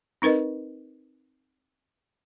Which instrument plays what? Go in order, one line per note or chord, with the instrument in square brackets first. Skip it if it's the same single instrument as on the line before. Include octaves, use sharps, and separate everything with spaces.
[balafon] C4 D#4 A#4 B4 D#5